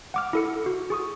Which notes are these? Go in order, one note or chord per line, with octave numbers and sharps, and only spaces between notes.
F#5 D6 F6
E4 A4 C#7
F#4
G#4 C#6 D#6